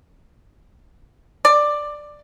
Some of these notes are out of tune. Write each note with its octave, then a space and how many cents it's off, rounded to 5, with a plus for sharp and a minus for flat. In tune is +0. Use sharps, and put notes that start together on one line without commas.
D5 +10